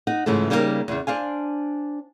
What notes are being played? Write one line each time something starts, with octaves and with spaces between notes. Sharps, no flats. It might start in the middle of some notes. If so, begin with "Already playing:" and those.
D#4 F#5
G#2 C#3 E3 F3 A3
C#3 G3 A#3 D#4 F4 A#4
E2 C#3
D4 C5 F5 G#5